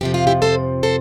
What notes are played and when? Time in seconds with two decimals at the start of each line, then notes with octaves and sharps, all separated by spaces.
0.01 F2 C3 F3 G4
0.14 F4
0.27 E4 G4
0.42 A4 C5
0.83 A4 C5